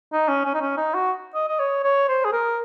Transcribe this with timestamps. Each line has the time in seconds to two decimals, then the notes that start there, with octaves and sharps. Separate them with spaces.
0.13 D#4
0.29 C#4
0.45 C#4
0.54 D#4
0.61 C#4
0.77 D#4
0.94 F#4
1.35 D#5
1.49 D#5
1.59 C#5
1.84 C#5
2.09 C5
2.25 G#4
2.33 A#4